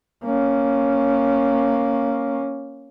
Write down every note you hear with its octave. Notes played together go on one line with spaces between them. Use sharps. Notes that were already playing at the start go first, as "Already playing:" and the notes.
A#3 C#4